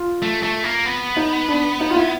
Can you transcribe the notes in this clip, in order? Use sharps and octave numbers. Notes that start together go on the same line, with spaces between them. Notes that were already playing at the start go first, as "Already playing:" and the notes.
Already playing: F4
A3
A3
A#3
B3
D#4
D4
D#4
F4
E4